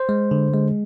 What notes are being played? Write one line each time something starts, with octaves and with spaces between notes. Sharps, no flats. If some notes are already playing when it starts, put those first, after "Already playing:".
Already playing: C5
G#3
D3
G#3